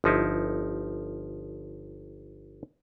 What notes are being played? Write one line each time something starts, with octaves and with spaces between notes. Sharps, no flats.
G1 F3 D#4 E4